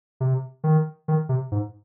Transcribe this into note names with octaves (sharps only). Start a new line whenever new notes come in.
C3
D#3
D#3
C3
G#2